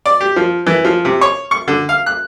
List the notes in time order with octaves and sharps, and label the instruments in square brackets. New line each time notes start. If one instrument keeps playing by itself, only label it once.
[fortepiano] D5
G4
F3
E3
F3
C3
C#5
C#6
D3
F5
F#6